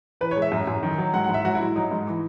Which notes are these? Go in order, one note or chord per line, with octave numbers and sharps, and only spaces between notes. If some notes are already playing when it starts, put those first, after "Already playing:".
E3 B4
C#5
G#3
E5
F#2
F#2
D#3
F#3
G#2 F#5
F#5
G#2
E5
F#3 F#4
E4
G#2
F#3 D#4
G#2
E3